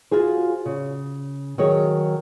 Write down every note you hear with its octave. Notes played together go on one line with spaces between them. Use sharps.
F4 F#4 G#4 C5
C#3
D#3 F#3 G#4 C#5